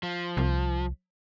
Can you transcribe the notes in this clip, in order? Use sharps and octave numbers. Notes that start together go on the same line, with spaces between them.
F3
C2